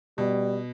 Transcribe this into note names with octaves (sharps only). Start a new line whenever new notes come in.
B2 G3